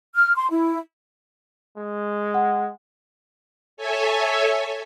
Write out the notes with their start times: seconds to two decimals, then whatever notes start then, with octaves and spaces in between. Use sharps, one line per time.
0.15 F6
0.35 C6
0.49 E4
1.78 G#3
2.34 F#5
3.77 A4 C#5 E5 G#5